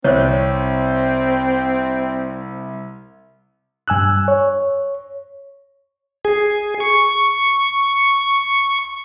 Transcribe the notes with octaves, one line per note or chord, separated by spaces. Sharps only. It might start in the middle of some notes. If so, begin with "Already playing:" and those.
C2 C4 C5 C#5
G2 G#5 E6 F#6
C#5
G#4
C#6